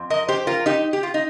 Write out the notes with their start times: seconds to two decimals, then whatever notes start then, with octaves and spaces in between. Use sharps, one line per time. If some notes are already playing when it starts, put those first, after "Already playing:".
Already playing: F2 C4
0.10 A#4 D#5
0.28 G4 C5
0.47 F4 A#4
0.66 D#4 G4
0.93 G4
1.03 F4
1.14 D#4